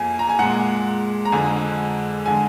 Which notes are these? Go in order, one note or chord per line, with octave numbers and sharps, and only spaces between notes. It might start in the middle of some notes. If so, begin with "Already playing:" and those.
Already playing: F2 F3 A#3 G#5
A#5
G#5
A#2 G#3 F#5
A#5
F2 D3 G#3 G#5
D3 G#3 G#5